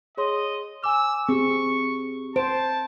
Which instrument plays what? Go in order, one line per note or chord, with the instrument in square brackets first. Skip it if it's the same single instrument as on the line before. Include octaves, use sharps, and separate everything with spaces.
[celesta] G#4 C#5 C6 [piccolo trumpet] D#5
[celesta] G#5 D6 [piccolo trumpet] E6
[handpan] C4 [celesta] G4 G#4 [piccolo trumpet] C#6
[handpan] C5 [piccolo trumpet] A5 [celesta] D7